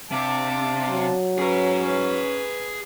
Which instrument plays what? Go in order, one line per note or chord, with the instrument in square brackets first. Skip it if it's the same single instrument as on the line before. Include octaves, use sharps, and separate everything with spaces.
[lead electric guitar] C3 [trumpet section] D4 F5 A5 [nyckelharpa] D6
[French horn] F#3
[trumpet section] C#4 [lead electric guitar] G#4 A#5 [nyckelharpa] B4
[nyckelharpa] B4